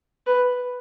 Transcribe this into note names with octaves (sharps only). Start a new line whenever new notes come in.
B4